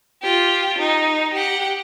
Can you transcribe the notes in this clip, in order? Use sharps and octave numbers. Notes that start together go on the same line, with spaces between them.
F4 G4
D#4
G4 F#5